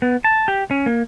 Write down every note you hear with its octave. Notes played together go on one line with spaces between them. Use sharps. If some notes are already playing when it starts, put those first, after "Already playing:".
B3
A5
G4
C#4
A#3